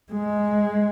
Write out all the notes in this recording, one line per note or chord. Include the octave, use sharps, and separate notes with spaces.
G#3